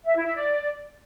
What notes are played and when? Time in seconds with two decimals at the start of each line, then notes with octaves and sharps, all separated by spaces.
0.05 E5
0.15 E4
0.25 E5
0.35 D5